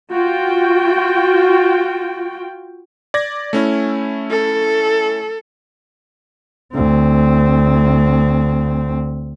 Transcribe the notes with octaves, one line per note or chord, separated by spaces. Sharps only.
F4 F#4 G5
D5 G#6 A#6
A3 C#4 E4
A4
D2 C4